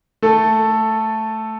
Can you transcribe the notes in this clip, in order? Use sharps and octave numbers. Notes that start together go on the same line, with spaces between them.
A3 A4